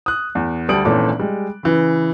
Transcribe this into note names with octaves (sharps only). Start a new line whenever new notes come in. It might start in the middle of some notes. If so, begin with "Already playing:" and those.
D#6 F#6
E2
D2 G3 A5 D#6 D7 F#7
G#1 A#2 E3 C#4 A4 D6
G3 G#3
C#3 E3